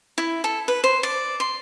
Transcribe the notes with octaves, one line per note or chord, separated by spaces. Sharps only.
E4
A4
B4
C5
D5
C6